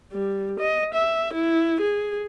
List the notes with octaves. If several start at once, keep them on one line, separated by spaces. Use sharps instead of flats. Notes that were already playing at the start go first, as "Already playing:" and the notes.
G3
D#5
E5
E4
G#4